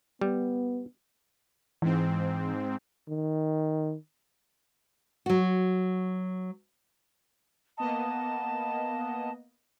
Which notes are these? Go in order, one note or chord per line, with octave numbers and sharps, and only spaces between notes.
G3 B3
G#2 E3 C4
D#3
F#3 F#4
A#3 B3 D#5 A5